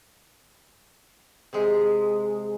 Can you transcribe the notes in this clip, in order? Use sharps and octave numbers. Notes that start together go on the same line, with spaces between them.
C3 G#3